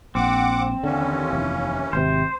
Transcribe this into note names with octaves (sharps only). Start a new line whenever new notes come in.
A#1 C4 F#5 D6
D#2 D3 E3 C#4
F1
G#1 C3 C5